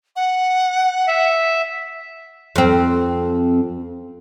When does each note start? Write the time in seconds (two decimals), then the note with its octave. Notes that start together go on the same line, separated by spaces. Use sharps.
0.16 F#5
1.08 E5
2.56 F2 C4